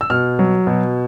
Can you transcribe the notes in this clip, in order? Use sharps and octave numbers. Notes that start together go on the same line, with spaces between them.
E6
B2 F6
F#3
B2